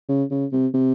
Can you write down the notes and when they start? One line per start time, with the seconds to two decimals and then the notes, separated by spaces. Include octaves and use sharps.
0.09 C#3
0.31 C#3
0.52 C3
0.74 C3